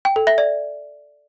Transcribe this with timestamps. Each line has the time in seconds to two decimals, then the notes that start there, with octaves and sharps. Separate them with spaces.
0.05 G5
0.16 A4
0.27 E5
0.38 D5